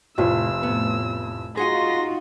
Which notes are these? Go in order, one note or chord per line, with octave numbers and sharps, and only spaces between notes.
F1 C2 F2 A2 E6
A2 B3
D#4 F4 F#4 G#4 F#5 G#5 C6 A#6